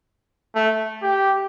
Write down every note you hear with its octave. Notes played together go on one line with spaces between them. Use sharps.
A3
G4